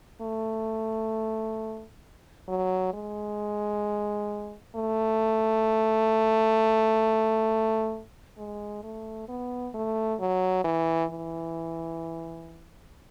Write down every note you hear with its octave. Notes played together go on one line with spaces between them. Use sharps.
A3
F#3
G#3
A3
G#3
A3
B3
A3
F#3
E3
E3